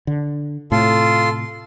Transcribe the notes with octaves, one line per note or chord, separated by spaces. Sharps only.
D3
A2 C3 F4 A4 C6